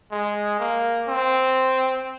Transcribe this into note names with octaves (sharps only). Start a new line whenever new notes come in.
G#3
A#3
C4